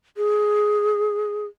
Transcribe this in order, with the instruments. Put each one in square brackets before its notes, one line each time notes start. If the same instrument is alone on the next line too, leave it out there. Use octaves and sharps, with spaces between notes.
[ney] G#4